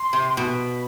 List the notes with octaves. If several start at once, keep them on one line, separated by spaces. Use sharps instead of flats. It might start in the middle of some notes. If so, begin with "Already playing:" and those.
Already playing: C6
C3
B2 B5